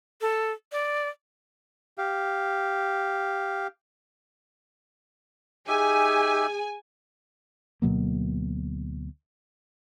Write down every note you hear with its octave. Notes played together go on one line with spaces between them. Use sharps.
A4
D5
G4 F5
D#4 G4 G#4 E5 G#5
D2 B2 F#3 A#3